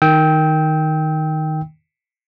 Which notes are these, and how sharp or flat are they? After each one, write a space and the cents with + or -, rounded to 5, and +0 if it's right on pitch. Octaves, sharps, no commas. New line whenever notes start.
D#3 +0 G5 +0 E6 -35